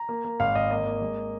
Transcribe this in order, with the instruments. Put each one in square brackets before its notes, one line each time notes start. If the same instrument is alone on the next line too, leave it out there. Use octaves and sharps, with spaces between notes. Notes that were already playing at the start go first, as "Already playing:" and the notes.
Already playing: [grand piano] A#5
A#3
A#3
G#1 F5
G#1 D#5
A#3 D#5
A#3
G#3